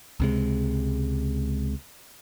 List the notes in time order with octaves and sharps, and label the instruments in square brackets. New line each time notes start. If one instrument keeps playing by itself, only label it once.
[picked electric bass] C#2 C3 G#3